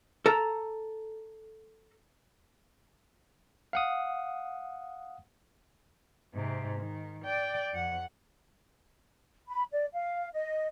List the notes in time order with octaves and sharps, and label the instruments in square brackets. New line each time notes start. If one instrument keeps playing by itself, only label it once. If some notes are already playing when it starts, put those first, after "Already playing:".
[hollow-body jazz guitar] A4 A#5
[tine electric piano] F5 F#5 D#6
[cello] G#2 C3
D#3
D5 G5
F2 F#5
[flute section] B5
D5
F5
D#5